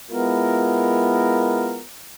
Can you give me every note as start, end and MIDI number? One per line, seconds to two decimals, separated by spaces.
0.11 1.80 56
0.11 1.80 59
0.11 1.80 64
0.11 1.80 65
0.11 1.80 70